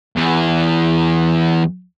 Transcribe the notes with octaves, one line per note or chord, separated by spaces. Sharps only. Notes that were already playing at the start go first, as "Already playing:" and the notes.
E2 E3